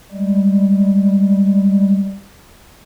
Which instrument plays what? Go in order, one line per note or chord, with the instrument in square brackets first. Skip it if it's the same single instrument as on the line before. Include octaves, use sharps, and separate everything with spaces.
[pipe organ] G3 G#3